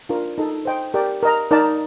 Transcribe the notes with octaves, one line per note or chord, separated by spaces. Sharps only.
D4 F4 A#4
D#4 A4 D#5 A5
C5 D#5 G5 C6
G4 A#4 D5 G5
A#4 D#5 A#5
D#4 A#4 D5 A5